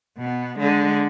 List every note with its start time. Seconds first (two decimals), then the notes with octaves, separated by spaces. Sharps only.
0.18 B2 B3
0.59 D3 G#3